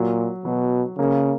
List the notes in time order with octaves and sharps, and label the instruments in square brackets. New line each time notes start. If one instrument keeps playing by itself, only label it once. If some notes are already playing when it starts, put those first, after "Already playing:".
Already playing: [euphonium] A#2 [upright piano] F#3
[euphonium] B2 [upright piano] F#3
[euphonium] C#3 [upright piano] A#3